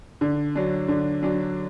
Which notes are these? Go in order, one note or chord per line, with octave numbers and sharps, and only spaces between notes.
D3
F#3 D4
D3
F#3 D4